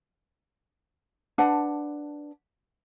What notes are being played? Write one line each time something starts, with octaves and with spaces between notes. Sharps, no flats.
D4 B4 F#5 A5